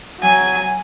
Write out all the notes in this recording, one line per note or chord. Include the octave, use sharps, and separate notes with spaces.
F#3 G#5